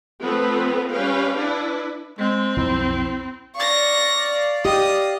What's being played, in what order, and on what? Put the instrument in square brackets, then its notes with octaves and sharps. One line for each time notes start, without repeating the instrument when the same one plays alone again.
[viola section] F3 A3 B3 C4 B4
G3 C#4 B4 F5 G5
D4 E4 B4
[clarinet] G#3 [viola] C4
[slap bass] B1 F2 F3 [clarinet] E4
[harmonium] D5 F5 [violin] C#6 A#6
[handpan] G4 [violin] D#5